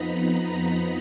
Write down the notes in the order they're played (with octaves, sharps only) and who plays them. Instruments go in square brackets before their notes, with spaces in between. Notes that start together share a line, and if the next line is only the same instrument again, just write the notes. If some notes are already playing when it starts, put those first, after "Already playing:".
Already playing: [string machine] F2 F3 B3 D#4 A#5 B5